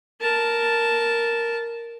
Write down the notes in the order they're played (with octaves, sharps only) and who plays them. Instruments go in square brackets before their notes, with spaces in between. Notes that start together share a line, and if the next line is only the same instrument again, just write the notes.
[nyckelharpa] A#4 A5